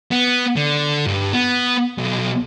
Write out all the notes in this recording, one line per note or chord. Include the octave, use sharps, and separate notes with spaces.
B3
D3
G2
B3
B1